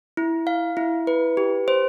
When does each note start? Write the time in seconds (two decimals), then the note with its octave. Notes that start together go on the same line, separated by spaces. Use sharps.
0.17 E4
0.47 F5
0.77 E4
1.07 B4
1.37 G4
1.68 C5